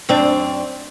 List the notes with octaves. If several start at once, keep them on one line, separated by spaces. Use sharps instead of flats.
F#2 C4 D4